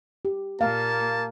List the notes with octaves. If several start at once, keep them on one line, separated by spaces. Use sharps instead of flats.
G4
A#2 A#3 F5 A5